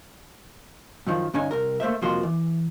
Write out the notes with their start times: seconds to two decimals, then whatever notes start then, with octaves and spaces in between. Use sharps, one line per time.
1.07 F#2 D#3 F3
1.34 G2 D3 C#4 D#4 G#5
1.51 C2 A#4
1.80 A3 A#3 C5 E5
2.02 C2 F2 F3 A#3 F#4 C6
2.23 E3